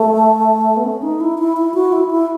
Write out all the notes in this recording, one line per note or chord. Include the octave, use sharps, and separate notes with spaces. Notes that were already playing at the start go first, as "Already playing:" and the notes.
Already playing: A3
B3
C#4
D#4
E4
E4
E4
F#4
E4
E4